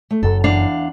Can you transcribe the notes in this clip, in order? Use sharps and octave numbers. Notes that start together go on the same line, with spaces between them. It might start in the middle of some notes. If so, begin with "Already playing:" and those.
A3
F#1 F#2 A4
E2 D4 F5